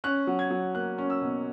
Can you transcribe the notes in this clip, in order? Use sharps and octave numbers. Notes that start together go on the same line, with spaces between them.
C#4 F#6
F#3
G#6
F#3
A#3 F#6
C#4
E6
B2